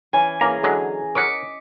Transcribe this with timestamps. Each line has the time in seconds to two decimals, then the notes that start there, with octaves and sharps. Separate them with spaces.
0.13 E3 C#4 G#5
0.41 E3 A#3 C#4 G#4 A#5
0.63 D3 F#3 G#3
1.15 A#4 C#5 D#5 F#5 D6 B6 C#7